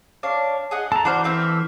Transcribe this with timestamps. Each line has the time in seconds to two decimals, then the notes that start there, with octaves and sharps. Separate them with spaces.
0.23 D4 C#5 F5
0.71 G#4 D#5 F#5
0.92 A4 A5 A#5
1.05 E3 D4 F#4 C5 C6 F6
1.24 A3 C4 E5